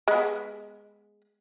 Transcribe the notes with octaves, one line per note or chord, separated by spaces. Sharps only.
G#3 B3